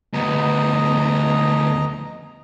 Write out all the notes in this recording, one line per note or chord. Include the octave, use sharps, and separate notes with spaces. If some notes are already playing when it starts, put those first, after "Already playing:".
D2 B3 D#5 A#5